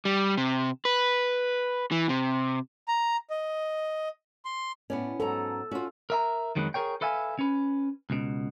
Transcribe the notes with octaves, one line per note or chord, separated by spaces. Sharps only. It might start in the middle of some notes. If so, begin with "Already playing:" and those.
G3
C3
B4
E3
C3
A#5
D#5
C6
A2 B3 C#4 D5
G#2 F#3 A4 A#5
C#4 F4 F#4
A#4 E5 A#5
F2 D#3 F#3 G#3 B3 B4
G#4 A#4 C#5 G5
A4 B4 E5 F5 G#5
C#4 B4
C#2 B2